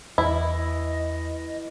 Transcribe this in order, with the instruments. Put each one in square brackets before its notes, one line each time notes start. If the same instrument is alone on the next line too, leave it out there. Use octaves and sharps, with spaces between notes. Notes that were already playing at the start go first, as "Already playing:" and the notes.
[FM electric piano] E2 [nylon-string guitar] E3 [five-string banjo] E4 [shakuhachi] D#5